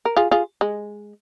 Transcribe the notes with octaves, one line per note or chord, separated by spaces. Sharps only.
A#4
F4 G#4
F4 G#4
G#3